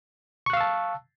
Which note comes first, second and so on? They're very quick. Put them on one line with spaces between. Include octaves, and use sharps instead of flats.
C#6 F#6 F5 E6 A5